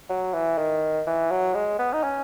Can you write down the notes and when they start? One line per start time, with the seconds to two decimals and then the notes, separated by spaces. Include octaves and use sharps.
0.10 F#3
0.34 E3
0.58 D#3
1.06 E3
1.31 F#3
1.55 G#3
1.79 B3
1.93 D#4
2.03 C#4